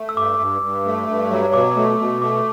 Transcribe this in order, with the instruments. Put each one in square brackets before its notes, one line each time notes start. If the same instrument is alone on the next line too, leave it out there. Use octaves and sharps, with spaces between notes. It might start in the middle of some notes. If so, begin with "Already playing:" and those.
Already playing: [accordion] A3
[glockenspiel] E6
[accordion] G2 [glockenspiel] D6
[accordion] G2
G2
A3
G2
F#3
[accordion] B2 [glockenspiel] D6
[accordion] A3
B2
[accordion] A3 [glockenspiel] D6